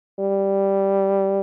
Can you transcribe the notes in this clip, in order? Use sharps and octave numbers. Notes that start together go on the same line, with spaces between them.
G3